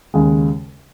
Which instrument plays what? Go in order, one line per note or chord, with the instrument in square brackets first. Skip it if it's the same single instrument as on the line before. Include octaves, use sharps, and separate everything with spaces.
[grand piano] D#2 C#3 G#3